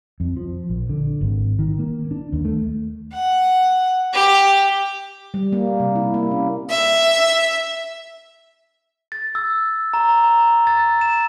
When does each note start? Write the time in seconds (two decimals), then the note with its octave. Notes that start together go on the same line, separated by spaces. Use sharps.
0.20 F2
0.36 F3
0.69 A#1
0.89 D3
1.21 G#1
1.59 D#3
1.79 A#3
2.11 D4
2.32 D#2
2.45 A3
3.13 F#5
4.13 G4
5.34 G3
5.53 A#3
5.80 C3
5.96 E4
6.14 A#3
6.31 C#4
6.71 E5
9.12 A6
9.35 E6
9.93 A#5
10.24 A#5
10.67 A6
11.01 E7